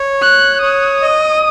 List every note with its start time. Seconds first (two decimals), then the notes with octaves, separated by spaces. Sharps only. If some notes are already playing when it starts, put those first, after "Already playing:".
Already playing: C#5
0.22 F#6
0.62 C#5 D#6
1.02 D#5